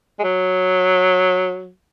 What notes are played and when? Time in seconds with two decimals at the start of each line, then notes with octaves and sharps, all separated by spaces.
0.19 G#3
0.23 F#3